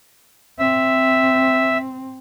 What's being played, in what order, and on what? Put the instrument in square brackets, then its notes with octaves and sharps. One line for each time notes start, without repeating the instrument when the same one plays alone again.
[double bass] C4 [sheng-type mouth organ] E5